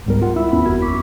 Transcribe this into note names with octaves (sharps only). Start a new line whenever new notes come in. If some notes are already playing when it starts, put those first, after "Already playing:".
C#2 G#2 G3 B3 A#4
F4 F#5
E4 E5 B5 E6
D#2 B3 C#4 B5
G#1 F2 F#4 A#4 E6 G#6
C#6 D6 B6